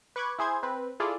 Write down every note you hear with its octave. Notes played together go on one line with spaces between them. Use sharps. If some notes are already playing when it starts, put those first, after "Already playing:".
B4 C#6 D6 F#6 G#6
E4 G#4 C5 G#6
C4 B4
E4 F4 G#4 A4 D5